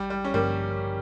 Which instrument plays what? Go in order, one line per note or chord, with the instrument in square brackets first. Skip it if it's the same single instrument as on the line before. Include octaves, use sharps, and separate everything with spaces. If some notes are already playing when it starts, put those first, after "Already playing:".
Already playing: [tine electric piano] A1 [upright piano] G3
[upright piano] G3
C#4
[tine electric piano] G2 D3 F3 [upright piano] G3 A#3